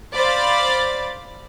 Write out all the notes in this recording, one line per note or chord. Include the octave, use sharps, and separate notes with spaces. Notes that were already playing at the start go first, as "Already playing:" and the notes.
C5 D5 F5 B5 A6